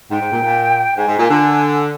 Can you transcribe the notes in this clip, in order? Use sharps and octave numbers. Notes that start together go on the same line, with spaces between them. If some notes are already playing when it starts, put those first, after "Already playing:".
G#2 G5
G#2
A#2
A#2
G#2 G#5
G#2
A#2
D3